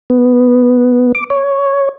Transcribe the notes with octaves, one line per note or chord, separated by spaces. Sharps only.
B3
D6
C#5